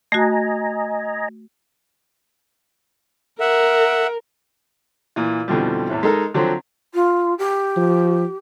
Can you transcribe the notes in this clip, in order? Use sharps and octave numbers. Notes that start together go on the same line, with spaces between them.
A3 F#4 D#5 G#5 A#5
A#4 E5 F#5
A#2 E3
F2 B2 D3 E3 F3 G3
E2 A2 E3
G#3 D#4 A4 A#4
D3 F3 F#3 C4
F4
G4
F3